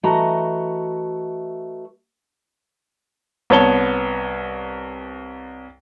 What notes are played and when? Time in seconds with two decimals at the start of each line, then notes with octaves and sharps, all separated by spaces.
0.03 E3 A3 F#4 D#5 A#5
3.50 C2 B3 C#5 A5 G7